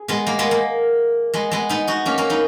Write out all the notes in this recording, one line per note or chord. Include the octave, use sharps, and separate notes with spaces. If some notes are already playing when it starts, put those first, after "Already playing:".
Already playing: G#4
G#3 B3
A#3
G#3 B3
A#3
G#3 B3
G#3 B3
B3 D#4
D#4 F#4
A#3 C#4
A#3 C#4
B3 D#4